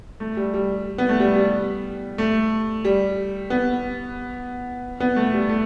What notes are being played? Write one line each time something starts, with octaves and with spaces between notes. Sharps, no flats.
A3
G3
G3
B3
A3
G3
G3
A3
G3
B3
B3
A3
G3
A3